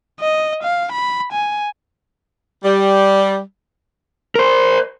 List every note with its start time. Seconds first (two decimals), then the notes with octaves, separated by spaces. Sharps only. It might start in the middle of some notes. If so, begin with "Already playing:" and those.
0.20 D#5
0.63 F5
0.92 B5
1.33 G#5
2.64 G3
4.35 A#4 C5